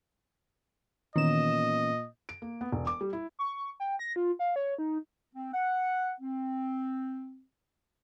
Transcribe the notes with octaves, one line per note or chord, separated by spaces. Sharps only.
A#2 D#3 E3 B3 C#4 D#5 E7
D7
A#3
B3
E1
D6
G3
E4
C#6
G5
A#6
F4
F5
C#5
D#4
C4
F#5
C4